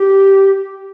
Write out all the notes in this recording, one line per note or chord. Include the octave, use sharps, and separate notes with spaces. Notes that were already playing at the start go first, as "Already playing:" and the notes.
Already playing: G4